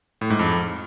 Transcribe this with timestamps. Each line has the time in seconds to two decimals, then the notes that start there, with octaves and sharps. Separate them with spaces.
0.21 A2
0.30 G#2
0.39 F2